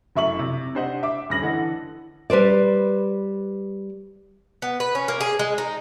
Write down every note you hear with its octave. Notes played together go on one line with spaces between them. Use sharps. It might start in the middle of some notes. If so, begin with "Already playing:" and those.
F1 F#2 E4 E5 C#6 F#7
C3
D4 G4 C5 D#5 F#5
E5 D6
D#1 G2 C#4 A#6 F#7
D3 E3 A4 D#5 F#5
G3 B4 C5 D5
B3
B4
C#4
A#3
G#4
G#3
D#4